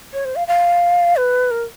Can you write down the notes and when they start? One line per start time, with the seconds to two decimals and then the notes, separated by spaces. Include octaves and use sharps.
0.13 C#5
0.25 C5
0.36 F5
0.48 F5
1.16 B4
1.51 A#4